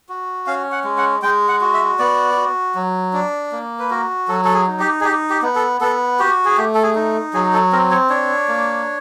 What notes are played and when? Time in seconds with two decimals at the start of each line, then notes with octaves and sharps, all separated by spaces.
0.09 F#4
0.47 C#4 F5
0.72 F#5
0.84 G#3
0.98 F#5
1.23 G#3 G5
1.49 F#5
1.61 F#4
1.74 E5
1.99 B3 D5
2.37 F#4
2.75 F#3
3.13 D4
3.52 A#3
3.79 B4
3.90 F#4 A#4
4.28 F#3 A4
4.45 A4
4.54 G#4
4.67 D#4
4.80 G4
5.01 G#4
5.04 D#4 G4
5.30 G4
5.42 B3
5.55 A4
5.81 B3 A4
6.19 F#4 G4
6.45 G#4
6.57 A3 G4
6.75 A4
6.83 G#4
6.95 D#4
7.34 F#3 G#4
7.53 A4
7.72 C4 A#4
7.91 C#5
8.10 D4 C#5
8.48 A#3